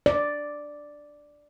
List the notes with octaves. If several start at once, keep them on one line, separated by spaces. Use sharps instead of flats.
D5